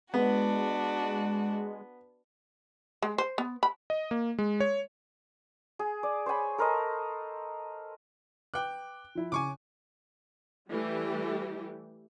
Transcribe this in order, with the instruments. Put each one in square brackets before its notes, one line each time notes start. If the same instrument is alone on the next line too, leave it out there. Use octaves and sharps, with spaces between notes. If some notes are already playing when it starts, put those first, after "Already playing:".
[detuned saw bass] G#3 [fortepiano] B3 [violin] D4 F#4
[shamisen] G#3
C5
B3
B5
[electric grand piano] D#5
A#3
G#3
C#5
[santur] G#4
D5
C5 C#5 G#5 B5
A4 A#4 C5 D#5
[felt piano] B4 D6 [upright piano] G5 F#6
[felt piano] F3 E4
[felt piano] C#3 [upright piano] G#5 C#6 D6
[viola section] E3 G3 A3 G4